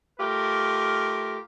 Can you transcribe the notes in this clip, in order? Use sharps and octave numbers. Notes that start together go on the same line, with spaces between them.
A3 F4 G4 A#4